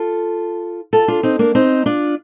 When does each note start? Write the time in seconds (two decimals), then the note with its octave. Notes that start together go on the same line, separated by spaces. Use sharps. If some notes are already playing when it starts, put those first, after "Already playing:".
Already playing: F4 A4
0.93 F4 A4
1.08 D4 F4
1.23 C4 D#4
1.39 A#3 D4
1.55 C4 D#4
1.86 D4 F4